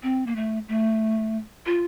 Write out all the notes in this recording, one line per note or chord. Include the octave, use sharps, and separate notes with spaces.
C4
A#3
A3
A3
F4